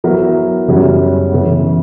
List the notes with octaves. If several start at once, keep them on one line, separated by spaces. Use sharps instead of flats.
F#3 B3 E4 A#4
F#2 C#3 G3 C#4 F#4
C#3 E3 B3